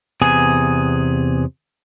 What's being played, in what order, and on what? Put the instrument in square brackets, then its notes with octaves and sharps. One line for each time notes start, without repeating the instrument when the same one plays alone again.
[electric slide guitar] E2 C3 B3 G#4 G#5